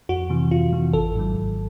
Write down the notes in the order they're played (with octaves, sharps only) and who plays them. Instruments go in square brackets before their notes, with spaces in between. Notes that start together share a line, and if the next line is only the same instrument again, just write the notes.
[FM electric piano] F2 F#4
C3 E3
F2 F4
C3 E3
G#1 A4
G#2 D#3 F#3
G#1